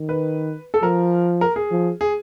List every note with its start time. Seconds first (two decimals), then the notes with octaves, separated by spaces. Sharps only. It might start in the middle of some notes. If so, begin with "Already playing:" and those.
Already playing: D#3
0.09 B4
0.74 A4
0.83 F3 A#4
1.41 A#4
1.56 G#4
1.71 F3
2.01 G#4